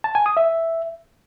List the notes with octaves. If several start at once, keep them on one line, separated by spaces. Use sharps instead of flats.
A5
G#5
D#6
E5